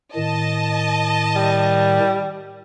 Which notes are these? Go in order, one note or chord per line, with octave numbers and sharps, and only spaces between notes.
A2 D#3 D#5 A5
G3